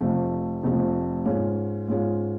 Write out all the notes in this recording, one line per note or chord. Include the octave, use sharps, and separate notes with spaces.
F1 F2 F3 A3
F1 F2 F3 A3
G#2 G#3 C#4 F4
G#2 G#3 C#4 F4